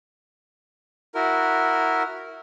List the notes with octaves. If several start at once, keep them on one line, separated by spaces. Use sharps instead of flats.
E4 F#4 A#4